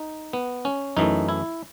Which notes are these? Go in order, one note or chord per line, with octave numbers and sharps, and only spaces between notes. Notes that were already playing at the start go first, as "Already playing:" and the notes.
Already playing: D#4
B3
C#4
F#2 E3 A3 D#4
E4